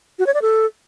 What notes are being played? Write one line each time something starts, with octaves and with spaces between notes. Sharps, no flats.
F#4
C#5
D5
A4